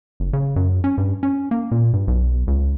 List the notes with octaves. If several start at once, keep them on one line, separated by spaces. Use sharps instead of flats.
F#1
C#3
F#2
C#4
G2
C#4
A#3
A#2
G2
B1
C#2